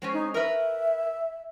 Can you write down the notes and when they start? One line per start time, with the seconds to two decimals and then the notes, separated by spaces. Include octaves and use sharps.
0.02 G#3 C4 C#4
0.13 D#4
0.34 A#4 B4 E5